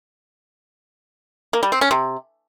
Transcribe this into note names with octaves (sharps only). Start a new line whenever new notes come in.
A#3
G3
C4
C#4
C3